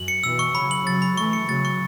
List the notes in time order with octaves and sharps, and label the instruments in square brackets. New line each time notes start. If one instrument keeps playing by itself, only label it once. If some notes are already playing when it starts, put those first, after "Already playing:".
Already playing: [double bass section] F#2 [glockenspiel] F#7
[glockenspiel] C#7
[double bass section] B2 E3 [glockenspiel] E6
[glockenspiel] C#6
[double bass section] C#3 F#3 [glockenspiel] B5
[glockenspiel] F#7
[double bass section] C#3 F#3 [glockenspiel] A6
[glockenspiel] B5
[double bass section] E3 A3 [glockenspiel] C#6
[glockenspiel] C#7
[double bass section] C#3 F#3 [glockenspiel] A6
[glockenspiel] C#6